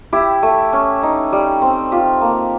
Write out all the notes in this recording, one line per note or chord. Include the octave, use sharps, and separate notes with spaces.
E4 G4
A3
C#4
D#4
G3
C4
F4 G4
A#3